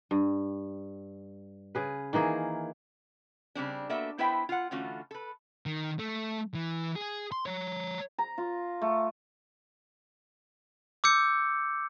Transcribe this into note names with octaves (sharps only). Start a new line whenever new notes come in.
G2
C#3 G#4 B4
D#3 E3 A#3 G#4
C#3 G3 C4 D4
A#3 B3 D4 F#4 A4 E5
B3 E4 B4 C5 E5 G5
F4 F#5
D3 E3 A3 C#4 F4 F#4
A4 B4
D#3
A3
E3
G#4
C6
C#5 A#5
A#5
F4
A3
D6 E6 G6 C#7